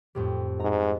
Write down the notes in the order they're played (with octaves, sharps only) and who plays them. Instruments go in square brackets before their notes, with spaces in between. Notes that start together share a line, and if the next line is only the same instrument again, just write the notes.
[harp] F2 A2 G3
[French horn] G#2 [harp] A#5